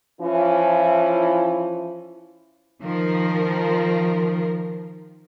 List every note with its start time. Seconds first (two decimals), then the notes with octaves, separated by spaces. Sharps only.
0.20 E3 F3 C#4 E4 F4
2.81 D#3 F3 A#4